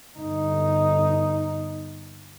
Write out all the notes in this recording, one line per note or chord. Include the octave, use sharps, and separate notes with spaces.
G1 D#4